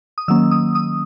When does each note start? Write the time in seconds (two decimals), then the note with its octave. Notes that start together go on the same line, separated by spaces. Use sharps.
0.18 D#6
0.28 D#3 F#3 A#3 C#4 E6
0.51 D#6
0.75 D#6